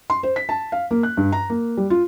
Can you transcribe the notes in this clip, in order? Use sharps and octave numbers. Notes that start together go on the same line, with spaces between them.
C6
C5
B6
A5
F5
A#3
F#6
G2
A#5
A#3
G3
F4